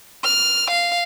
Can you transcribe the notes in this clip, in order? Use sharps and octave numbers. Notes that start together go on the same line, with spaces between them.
F6
F5